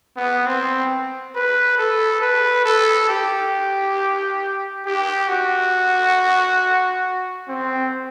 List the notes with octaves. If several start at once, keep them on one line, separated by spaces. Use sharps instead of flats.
B3
C4
B4
A4
B4
A4
G4
G4
F#4
C4